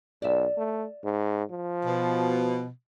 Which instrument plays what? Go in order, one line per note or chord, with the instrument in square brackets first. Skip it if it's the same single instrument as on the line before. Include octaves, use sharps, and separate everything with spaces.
[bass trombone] B1 [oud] D5 E5
[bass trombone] A3
G#2
F3
[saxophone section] B2